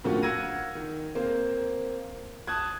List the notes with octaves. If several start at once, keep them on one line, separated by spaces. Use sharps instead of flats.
A2 D3 F3 A#3 C#4 F#4
F5 F#5 E6 G#6 A#6 D#7
D#3
A#3 C4 C5
A5 D#6 F#6 G#6